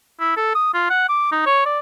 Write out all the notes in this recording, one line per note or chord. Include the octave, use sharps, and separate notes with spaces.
E4
A4
D#6
F4
F#5
D6
D#4
C#5
D5